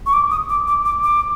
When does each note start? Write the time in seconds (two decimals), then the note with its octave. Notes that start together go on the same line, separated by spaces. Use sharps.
0.06 C#6
0.13 D6
0.31 D#6
0.49 D6
0.67 D6
0.85 D6
1.03 D6